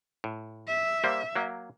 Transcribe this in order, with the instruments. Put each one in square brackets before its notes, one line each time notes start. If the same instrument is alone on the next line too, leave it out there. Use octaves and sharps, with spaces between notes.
[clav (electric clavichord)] A2
[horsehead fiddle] E5
[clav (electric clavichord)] G3 A#3 C5
F#3 A#3